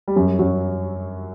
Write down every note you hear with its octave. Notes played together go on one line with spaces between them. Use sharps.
G3
F#2 F#3
F#2 F#3